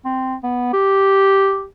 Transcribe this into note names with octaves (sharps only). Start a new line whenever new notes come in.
C4
B3
G4